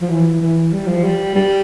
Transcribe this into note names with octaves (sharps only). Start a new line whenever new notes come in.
F3
E3
E3
G3
F3
G3
G3